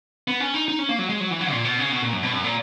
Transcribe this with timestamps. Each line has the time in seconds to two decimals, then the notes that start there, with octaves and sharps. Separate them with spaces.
0.28 B3
0.40 C#4
0.54 D#4
0.68 D#4
0.79 C#4
0.89 A#3
0.99 F#3
1.10 G#3
1.20 F#3
1.31 E3
1.41 F#3
1.51 A#2
1.65 B2
1.79 C#3
1.92 B2
2.03 A#2
2.13 F#2
2.23 B2
2.33 F#2
2.44 A#2